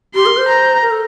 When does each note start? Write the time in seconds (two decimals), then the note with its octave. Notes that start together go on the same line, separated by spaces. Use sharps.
0.15 G4 C6
0.26 A#4
0.37 C5
0.49 A#5
0.82 A#4
0.91 A4